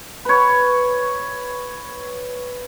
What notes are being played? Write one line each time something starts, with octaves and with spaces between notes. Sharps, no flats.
B4 C#5